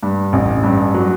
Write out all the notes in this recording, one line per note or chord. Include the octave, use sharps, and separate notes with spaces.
G2
A1
G2
F#3